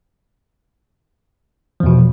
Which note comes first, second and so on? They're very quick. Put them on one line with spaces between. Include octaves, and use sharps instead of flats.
F3 E2 B2